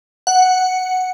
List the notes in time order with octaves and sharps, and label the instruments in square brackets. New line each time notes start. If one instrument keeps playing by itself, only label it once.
[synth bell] F#5